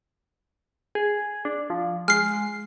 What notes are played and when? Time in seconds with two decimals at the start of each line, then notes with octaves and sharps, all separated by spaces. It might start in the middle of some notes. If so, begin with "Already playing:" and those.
0.95 G#4
1.45 D4
1.70 F3
2.08 G#3 F6 C7